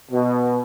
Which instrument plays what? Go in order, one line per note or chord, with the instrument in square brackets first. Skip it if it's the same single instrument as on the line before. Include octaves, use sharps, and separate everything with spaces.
[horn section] B2